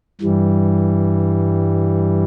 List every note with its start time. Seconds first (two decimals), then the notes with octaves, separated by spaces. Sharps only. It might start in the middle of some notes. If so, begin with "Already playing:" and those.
0.21 G2 E3 G3